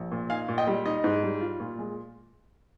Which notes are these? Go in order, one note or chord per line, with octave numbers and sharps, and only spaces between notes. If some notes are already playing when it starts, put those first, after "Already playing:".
Already playing: A#1
A#2
D#4 F5 G#5
A#2
D#5 G5
G3
D#4 D#5
G#2
G3
F4
A#2
G#3